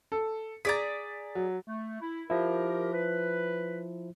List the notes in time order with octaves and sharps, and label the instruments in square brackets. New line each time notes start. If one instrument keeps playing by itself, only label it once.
[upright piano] A4
[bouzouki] G#4 D5 A#5 [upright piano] A6 B6
[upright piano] F#3
[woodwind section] A3
E4
[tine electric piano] F3 E4 [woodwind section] G4 A#4
[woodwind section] B4